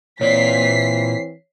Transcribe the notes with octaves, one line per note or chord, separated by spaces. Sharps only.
A#2 E3 C4 C#5 D5 B6 C7